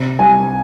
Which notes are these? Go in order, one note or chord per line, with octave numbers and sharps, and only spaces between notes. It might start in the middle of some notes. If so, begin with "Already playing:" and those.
Already playing: C3
C2 G#5